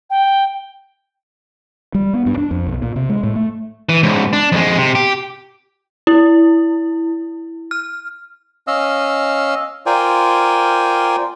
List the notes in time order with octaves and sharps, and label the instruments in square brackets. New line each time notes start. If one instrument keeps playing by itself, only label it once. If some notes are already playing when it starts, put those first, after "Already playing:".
[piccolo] G5
[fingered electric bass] G3
B3
G2
D4
F2
B1
A#2
C3
G#3
A2
A3
[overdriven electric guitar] E3
C#2 G#2
D4
F2 G#3
C3
G4
[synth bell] E4
F6
[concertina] C#4 D#5 F5 E6
F4 A#4 C5 D5 G5 G#5